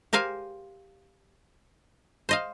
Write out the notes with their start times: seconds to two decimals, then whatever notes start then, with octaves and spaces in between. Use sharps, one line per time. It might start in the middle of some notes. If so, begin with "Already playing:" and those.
0.13 G4 A#4 C5 F5 G#5
2.29 C5 D#5 F5